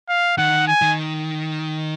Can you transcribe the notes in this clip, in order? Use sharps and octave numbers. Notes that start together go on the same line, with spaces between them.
F5
D#3 F#5
G#5
D#3